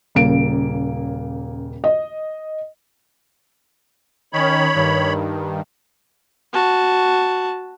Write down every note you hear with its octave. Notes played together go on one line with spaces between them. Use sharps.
D#1 C#3 A#3 D7
D#5
D#3 C#4 C#5 B5
G2 D#3
F#4 A5